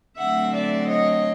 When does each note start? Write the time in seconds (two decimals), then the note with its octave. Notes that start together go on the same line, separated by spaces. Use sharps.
0.19 D3 F#3 A3 C4 E5 F#5
0.53 D5 E5
0.88 C#5 D#5